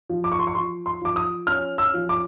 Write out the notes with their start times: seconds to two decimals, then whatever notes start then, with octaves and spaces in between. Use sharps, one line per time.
0.10 F3
0.24 D6
0.32 C#6
0.39 C6
0.47 C#6
0.55 F3 C6
0.86 C6
1.01 F3 D6
1.16 D#6
1.47 C#4 F6
1.78 E6
1.94 F3
2.09 D6